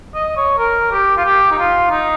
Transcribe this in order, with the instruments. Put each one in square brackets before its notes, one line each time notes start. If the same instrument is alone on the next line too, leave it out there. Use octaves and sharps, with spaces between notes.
[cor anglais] D#5
C#5
A#4
G4
F4
G4
D#4
F4
D#4